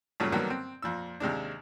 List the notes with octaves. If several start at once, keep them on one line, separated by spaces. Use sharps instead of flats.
G2 A#2 C#3 F#3 A3
G2 D3 D#3 F#3 A#3 B3
C4
F2 A#2 E6
D#2 C3 G#3 D4